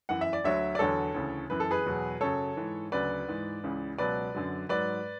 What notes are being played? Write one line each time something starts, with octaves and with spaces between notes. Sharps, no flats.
F#2 E3 F#5
E5
D5
D2 D3 F#3 C#5 E5
D5
E2 D3 F#3 A4 C#5
D2 C#3 E3
F#2 E3 B4
A4
G#4 B4
E2 B2 F#3
F#2 C#3 F#3 A4 C#5
G#2 E3
D2 C#3 F#3 B4 D5
G#2 E3
C#2 C#3 E3
C#2 B2 F#3 B4 D5
F#2 D3 F#3
G#2 F#3 B4 D5